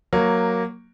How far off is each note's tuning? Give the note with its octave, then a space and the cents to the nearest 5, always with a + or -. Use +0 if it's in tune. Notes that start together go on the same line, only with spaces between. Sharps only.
F#3 +0 A#3 +0